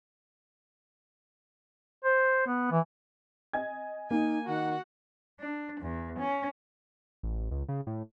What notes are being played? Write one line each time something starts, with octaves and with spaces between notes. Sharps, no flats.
C5
B3
E3
D#5 G#5 G#6
A#3 D#4 G#5
D#3 F#4 F#5
D4
E2
C#4
A1
C#2
C#3
A2